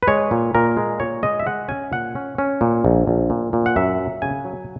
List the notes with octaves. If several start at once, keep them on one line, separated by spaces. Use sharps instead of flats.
B4
G#3 C#5
A#2
A#2 A#4
G#3
A#2 C#5
G#3 D#5
E5
G#3 F#5
C#4 G#5
A#2 F#5
C#4
C#4
A#2
A#1
A#1
A#2
A#2
F#5
F#2 E5
F#3
C#3 G#5
F#3